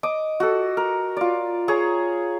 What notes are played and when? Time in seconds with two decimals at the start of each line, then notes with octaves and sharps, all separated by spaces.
0.03 D#5 D6
0.40 F#4 A4
0.77 A#4
1.17 F4 D5
1.68 G#4 C#5 A#5